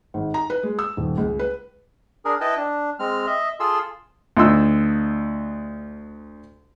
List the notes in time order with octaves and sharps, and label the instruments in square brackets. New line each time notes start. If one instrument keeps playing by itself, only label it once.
[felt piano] G#1
A#5
B4
G#3
E6
D#1
C#2
B4
[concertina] D4 G#4 A#4
E4 B4 D#5 G5 A5
D4
G#3 C4 F6
D#5 E5
F4 G#4 A4 C6 E6
[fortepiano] D2 D#4 F4 C6 E6